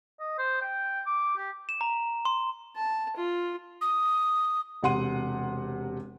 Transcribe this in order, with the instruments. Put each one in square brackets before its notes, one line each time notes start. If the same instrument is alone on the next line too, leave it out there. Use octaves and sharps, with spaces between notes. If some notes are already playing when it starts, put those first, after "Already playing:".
[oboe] D#5
C5
G5
D6
G4
[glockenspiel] E7
A#5
C6
[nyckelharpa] A5
F4
[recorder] D#6
[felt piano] E1 C3 F#5 C6 D#7